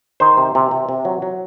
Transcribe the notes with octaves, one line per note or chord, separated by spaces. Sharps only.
D#3 C5
C3
C3
C3
C3
F#3
F#3